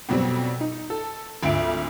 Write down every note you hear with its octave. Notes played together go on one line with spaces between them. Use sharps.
F2 B2 F#3 G3 C4
D#4
A4
G#1 D2 F4 E5 D7